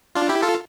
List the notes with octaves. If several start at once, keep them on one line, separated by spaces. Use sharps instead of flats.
D4 F4
E4 G4
F4 A4